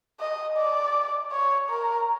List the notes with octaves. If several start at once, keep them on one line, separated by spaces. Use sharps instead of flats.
D#5
D5
C#5
A#4